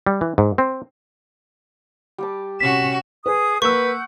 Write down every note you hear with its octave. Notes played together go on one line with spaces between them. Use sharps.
G3
E3
G#2
C4
G3 G4 A5
C3 C#4 F#4 B6 E7
G#4 B4 D#6
A#3 B4 F#5 C#6 E6 G6